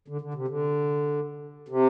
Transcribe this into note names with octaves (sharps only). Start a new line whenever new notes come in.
D3
D3
C3
D3
C3